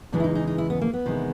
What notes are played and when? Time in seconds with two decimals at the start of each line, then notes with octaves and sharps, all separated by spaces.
0.12 E2 C#3 E3 G#3 D4
0.20 E4
0.24 D#4
0.35 D#4
0.47 D#4
0.58 E4
0.70 B3
0.81 A#3
0.93 B3
1.05 E2 C3 D#3 G#3